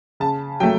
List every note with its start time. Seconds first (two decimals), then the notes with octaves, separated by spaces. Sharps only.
0.20 C#3 A5
0.60 F#3 G5
0.63 A3